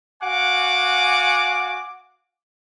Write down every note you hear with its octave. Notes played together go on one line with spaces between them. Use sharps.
F#4 F5 F#5 G#5 D6